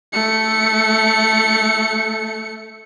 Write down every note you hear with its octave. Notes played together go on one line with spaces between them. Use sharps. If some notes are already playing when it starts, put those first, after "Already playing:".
A3 C#7